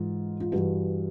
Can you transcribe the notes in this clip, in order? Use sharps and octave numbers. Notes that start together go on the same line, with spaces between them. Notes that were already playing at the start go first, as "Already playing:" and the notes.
Already playing: G#2 E3 F4
F4
G2 E3 F#4